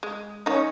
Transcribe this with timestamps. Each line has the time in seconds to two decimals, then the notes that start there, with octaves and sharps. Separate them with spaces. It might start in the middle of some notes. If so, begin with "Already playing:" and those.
0.03 G#3
0.46 D#3 C#4 D#4